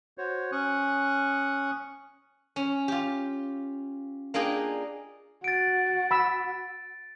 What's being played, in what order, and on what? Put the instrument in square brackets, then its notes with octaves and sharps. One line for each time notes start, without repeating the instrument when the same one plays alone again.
[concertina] F#4 C5 C#5
C#4 C#6 D#6 F#6
[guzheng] C#4
F4 G4
A#3 D4 F4 G#4 D#5 G5
[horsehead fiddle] F#4 [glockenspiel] A6 D7
[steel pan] B5 E6